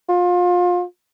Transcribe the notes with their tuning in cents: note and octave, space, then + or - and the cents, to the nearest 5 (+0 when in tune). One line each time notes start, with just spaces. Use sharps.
F4 +30